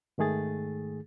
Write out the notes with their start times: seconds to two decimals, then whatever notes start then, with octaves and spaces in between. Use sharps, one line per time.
0.18 G#2 D#3 A3 G#4 A6